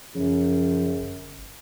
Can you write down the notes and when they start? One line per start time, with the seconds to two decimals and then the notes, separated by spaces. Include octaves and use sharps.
0.15 F#2 C#3 F3
0.98 G1